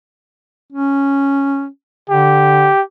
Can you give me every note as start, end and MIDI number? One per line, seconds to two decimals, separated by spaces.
0.72 1.67 61
2.10 2.68 50
2.10 2.82 67